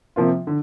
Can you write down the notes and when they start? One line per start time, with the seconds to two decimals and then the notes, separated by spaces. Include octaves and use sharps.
0.16 C3 F3 A#3 F4
0.47 D3